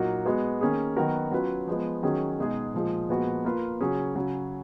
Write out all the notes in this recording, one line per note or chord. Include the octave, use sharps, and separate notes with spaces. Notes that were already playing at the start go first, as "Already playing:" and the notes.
Already playing: A#2 F#3 A#3 D#4 F#4
G#3 B3 F#4
D#3 A#3 C#4 G#4
D#3 F#3 B3 F#4 A#4
F#3 C#4 F4 B4
F3 G#3 B3
D#3 F#3 C#4 G#4
B2 G#3 D#4 G#4
A#2 F3 G#3
A#2 F3 G#3 B3 F#4
A#3 F4 B4
C#3 F#3 C#4 G#4
C#3 F#3 C#4